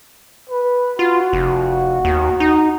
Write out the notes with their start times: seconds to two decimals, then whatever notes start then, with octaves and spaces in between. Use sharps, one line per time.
0.50 B4
0.99 F4 F#4
1.33 F1
2.05 D#2
2.40 D#4